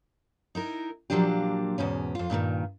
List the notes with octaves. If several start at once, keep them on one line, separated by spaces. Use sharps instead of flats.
D#4 E4 A#4
A#2 F3 F#3 A#3 D4 G4
E2 G#2 B2 C#4
F2 F4
G2 A#2 D3 D#3